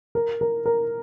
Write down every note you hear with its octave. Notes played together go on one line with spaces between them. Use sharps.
A#4
A#4
A#4